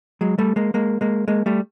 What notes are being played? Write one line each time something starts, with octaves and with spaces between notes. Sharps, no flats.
F#3 G#3
G3 A3
G#3 A#3
G#3 A#3
G#3 A#3
G#3 A#3
G3 A3